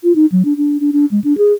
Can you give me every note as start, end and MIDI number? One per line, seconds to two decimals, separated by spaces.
0.04 0.15 65
0.16 0.26 63
0.32 0.43 54
0.45 0.57 62
0.57 0.77 62
0.80 0.91 62
0.93 1.06 62
1.11 1.20 56
1.24 1.36 62
1.38 1.53 68